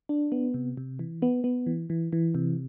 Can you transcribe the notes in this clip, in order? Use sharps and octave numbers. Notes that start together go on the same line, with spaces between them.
D4
B3
C3
C3
E3
B3
B3
E3
E3
E3
C3